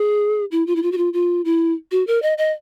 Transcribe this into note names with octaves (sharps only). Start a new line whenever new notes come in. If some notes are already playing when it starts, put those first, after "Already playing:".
Already playing: G#4
E4
F4
E4
F4
F#4
F4
F4
E4
F#4
A#4
D#5
D#5